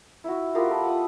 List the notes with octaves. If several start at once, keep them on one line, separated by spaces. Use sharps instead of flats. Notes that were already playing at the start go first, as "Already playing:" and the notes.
E4 F#4
B3 F4 G4 A#4
A4 B5
F#5 A5 D#6